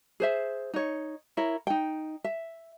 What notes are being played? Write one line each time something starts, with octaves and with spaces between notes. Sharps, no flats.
G#4 C5 E5
D#4 C#5
E4 A#4 C#5
D#4 G5
E5